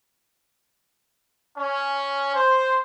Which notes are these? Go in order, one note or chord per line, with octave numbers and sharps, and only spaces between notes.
C#4
C5